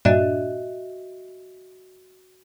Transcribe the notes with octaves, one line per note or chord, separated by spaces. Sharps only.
G2 A#2 D4 F#4 D#5 E5